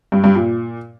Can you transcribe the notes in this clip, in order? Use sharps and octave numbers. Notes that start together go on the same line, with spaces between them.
G2
G2
A#2